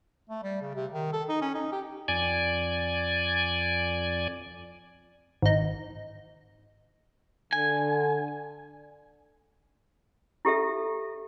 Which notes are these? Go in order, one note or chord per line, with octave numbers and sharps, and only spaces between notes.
A3
G3
C#3
C3
D#3
A4
D#4
C#4
D#4
G4
F2 D5 G#5
G#1 D#4
D3 G#5
E4 G4 A4 E5